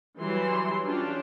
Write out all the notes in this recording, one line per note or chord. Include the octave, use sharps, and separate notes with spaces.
E3 F#3 G3 C6
C#4 D4 F4 G4